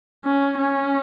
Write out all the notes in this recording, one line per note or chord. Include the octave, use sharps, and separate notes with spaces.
C#4
C#4